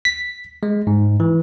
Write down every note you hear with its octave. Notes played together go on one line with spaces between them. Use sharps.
B6
G#3
G#2
E3